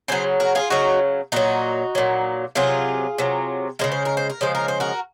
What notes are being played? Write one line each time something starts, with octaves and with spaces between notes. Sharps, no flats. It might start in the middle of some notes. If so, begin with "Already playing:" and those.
C#3 F#3 G#4 C5
F#4 A#4
F4 G#4
C#3 F#3 D#4 F#4
A#2 F#3 D#4 F#4
A#2 F#3
C3 F#3 F4 G#4
C3 F#3
C#3 F3 G#3 A#4
C5
A#4
C5
A#4
C#3 F3 G#3 C5
A#4
C5
F#4 A#4